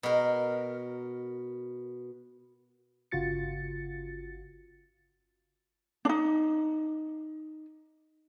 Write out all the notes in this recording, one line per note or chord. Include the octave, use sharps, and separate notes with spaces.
B2 A#4
G1 C#3 F4 F#4 A6 C#7
D4 D#4